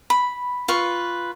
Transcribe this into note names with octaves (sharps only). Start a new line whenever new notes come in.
B5
F4 B4 C#6